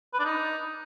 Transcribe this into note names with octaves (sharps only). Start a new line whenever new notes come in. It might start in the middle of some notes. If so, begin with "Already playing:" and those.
B4
D4
D#4